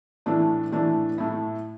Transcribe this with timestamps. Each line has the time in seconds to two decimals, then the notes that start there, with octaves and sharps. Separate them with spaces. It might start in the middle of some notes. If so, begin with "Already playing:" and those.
0.26 A2 E3 A3 D4
0.72 A2 E3 A3 D4
1.18 A2 A3 E4